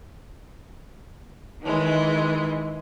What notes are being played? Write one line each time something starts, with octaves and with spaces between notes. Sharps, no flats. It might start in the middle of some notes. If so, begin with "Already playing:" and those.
D#3 E3 G#3